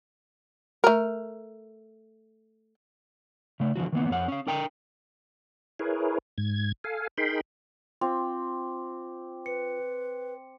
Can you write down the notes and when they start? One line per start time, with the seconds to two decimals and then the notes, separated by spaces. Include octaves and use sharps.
0.84 A3 A#4
3.60 C#3 A3
3.76 D3 E3 F3 F#4
3.92 D#3 E3 A#3 B3
4.09 F2 C#5 F#5
4.28 C#4 F5
4.47 D4 A#4 G5 A#5
5.79 E4 G#4 A#4 B4 C#5
6.38 G#2 G#6
6.84 A4 F5 G#5
7.18 D#4 G#4 A#4 G5 B5 C6
8.01 C4 F4 C6 D6
9.46 B4 C#7